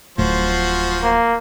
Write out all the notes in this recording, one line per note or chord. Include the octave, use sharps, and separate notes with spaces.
D1 A2 F3 F#4 C5
A#3